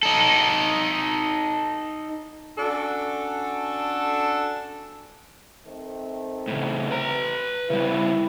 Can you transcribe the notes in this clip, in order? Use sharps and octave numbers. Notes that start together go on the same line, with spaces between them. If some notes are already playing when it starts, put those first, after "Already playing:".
D#4 A4
C#4 D4 F#4 A4
D#3 A3 C4
A2 C#3
B4 A#5
C#3 G3 E4